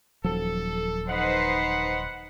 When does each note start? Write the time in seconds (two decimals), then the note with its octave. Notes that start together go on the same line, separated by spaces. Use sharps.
0.24 D#1 F3 F#3 A4
1.08 D#4 B4 C5 F#5